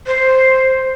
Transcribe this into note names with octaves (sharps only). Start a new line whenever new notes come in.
C5